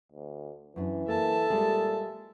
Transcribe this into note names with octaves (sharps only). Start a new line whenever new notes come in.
D2
F#2 E3 D4
A#3 A4 E5 A5
A#2 G3 G#3 G#4